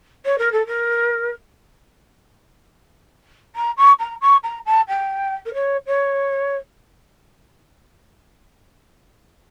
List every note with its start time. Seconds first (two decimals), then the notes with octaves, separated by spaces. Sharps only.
0.25 C#5
0.38 A#4
0.52 A4
0.66 A#4
3.55 A#5
3.77 C#6
3.99 A#5
4.21 C#6
4.43 A#5
4.65 A5
4.88 G5
5.45 A#4
5.53 C#5
5.86 C#5